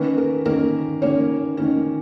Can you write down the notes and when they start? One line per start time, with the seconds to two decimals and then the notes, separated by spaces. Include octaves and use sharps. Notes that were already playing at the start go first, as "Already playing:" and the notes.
Already playing: D#3 A#3 C#4 B4
0.18 A#4
0.46 D#3 A#3 C#4 A#4
1.02 D#3 A#3 C#4 C#5
1.57 D#3 A#3 C#4